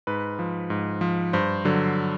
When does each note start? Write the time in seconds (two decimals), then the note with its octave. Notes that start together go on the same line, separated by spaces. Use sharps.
0.07 G#2 B4
0.39 F3
0.70 G#2
1.01 F3
1.33 G2 C5
1.65 D3 F#3